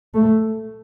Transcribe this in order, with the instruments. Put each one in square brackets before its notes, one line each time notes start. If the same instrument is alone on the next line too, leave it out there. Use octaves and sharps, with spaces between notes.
[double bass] A3